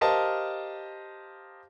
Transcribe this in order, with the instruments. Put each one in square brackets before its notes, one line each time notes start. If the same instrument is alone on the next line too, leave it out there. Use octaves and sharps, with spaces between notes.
[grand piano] G4 A#4 C5 D#5 F5 A5